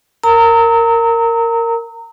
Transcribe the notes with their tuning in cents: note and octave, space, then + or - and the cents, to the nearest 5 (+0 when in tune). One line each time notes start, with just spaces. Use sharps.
A#4 -10 A#5 -25 E6 -40